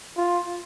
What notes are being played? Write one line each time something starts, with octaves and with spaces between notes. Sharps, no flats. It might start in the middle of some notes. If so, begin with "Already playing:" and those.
F4